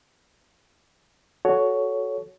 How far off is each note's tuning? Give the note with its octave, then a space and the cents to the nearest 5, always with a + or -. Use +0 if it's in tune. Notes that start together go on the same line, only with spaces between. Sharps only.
F#4 +0 A4 -20 C#5 +10